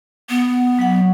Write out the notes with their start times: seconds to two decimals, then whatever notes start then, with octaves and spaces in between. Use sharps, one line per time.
0.29 B3
0.79 F#3 F#5